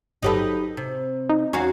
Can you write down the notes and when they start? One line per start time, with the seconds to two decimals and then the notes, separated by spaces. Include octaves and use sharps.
0.23 G1 F#3 D#4 G4 A4 B4
0.77 C3
1.29 D#4
1.53 E2 C#4 F#4 F5 A#5 G#6